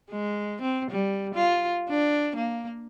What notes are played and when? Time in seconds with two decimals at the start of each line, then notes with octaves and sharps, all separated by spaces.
0.11 G#3
0.62 C4
0.91 G3
1.35 F4
1.90 D4
2.36 A#3